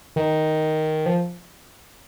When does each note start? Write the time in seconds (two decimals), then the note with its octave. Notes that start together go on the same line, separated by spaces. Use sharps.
0.16 D#3
1.06 F3